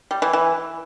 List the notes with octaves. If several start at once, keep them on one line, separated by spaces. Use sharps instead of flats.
G3
E3
E3